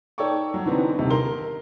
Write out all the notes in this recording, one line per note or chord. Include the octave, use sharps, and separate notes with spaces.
D#4 A4 C#5 D5 G5 C#6
F#3
D3 E3 B3 C4 D#4
D#1 C3 D#4
A#4 C6 G7